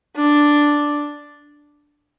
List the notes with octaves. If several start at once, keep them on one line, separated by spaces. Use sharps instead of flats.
D4